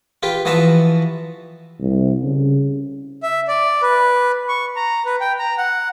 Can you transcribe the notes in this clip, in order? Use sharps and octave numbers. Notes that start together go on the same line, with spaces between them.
F4 G4 B4
E3 F3 F#4 B4 A5 D#6
C2
C#3
E5
D5
B4
C#6
A#5
B4
G5
A#5
F#5